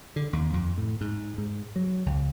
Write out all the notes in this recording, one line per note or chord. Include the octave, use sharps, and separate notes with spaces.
D3
D#2
F2
A2
G#2
G#2
F#3
C#2